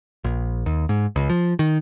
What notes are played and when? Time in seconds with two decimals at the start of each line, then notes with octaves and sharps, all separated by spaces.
0.24 A#1
0.66 D#2
0.89 G#2
1.16 C#2
1.30 F3
1.59 D#3